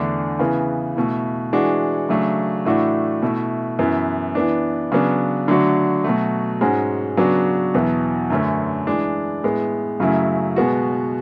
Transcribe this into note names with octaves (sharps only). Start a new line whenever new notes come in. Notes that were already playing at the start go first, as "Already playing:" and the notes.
Already playing: E2 D3 A3 D4
C#3 E3 B3
B2 A3 E4
E3 G#3 D4 F#4
C#3 F#3 A3 D4
A2 E3 A3 D4 F#4
B2 A3 E4
F#2 E3 B3 E4
E3 B3 D4
C#3 F#3 B3 D4
D3 F#3 A3 D4 F#4
B2 F#3 A3
G#2 G#3 C#4 F#4
C#3 F#3 B3 D4 F#4
E2 B2 F#3 B3 E4
F#2 D3 A3 C#4
E3 G#3 D4
A2 G#3 B3
F#2 C#3 F#3 A3 E4
B2 G#3 B3 F#4